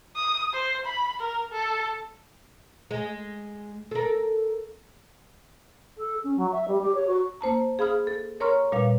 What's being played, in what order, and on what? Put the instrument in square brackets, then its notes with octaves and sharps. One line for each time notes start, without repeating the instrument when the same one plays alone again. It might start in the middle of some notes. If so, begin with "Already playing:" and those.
[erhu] D#6
C5
B5
A#4
A4
[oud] G#3
A4 A#4
[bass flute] A4
C#4
F#3
E5
G3
G4
C#5
F#4
[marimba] A#3 C5 A5 A#5
G#4 F5 B5 D#6 F6
A4
A#4 C#5 A#5 C6 C#6 F6
A#2 G3 B4 F5